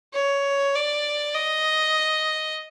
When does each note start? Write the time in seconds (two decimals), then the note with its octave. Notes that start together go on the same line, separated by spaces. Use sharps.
0.14 C#5
0.75 D5
1.35 D#5